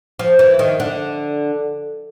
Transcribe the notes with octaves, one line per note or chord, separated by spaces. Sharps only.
F3
E3
D#3
D3